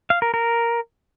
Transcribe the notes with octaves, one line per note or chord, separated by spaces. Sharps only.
F5
A#4
A#4